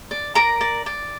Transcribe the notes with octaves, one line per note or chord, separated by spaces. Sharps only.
D5
A#4 D5 A#5
D5
D5